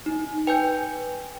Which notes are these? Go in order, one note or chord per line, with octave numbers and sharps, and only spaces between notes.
D#4
B4 G5 G#5 G6